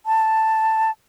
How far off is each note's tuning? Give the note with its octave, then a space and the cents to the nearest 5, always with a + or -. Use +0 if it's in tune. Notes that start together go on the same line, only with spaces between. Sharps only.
A5 +5